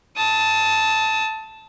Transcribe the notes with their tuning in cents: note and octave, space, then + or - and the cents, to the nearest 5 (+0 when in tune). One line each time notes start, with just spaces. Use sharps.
A5 +0 D#6 +35